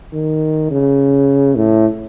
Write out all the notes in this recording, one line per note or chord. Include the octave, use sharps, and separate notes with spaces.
D#3
C#3
A2